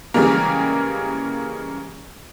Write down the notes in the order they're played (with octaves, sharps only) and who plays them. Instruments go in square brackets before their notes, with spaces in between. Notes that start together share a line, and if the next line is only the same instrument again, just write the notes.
[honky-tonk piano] C#3 E3 G3 G#3 A#3